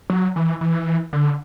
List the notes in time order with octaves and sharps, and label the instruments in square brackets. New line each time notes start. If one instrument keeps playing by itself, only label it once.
[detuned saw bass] F#3
E3
E3
D3